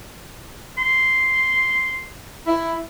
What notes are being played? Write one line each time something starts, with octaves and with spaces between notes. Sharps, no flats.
C6
E4